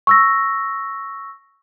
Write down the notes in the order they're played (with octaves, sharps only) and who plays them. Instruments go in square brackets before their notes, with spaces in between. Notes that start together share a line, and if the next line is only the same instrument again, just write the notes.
[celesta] C#6 E6 A#6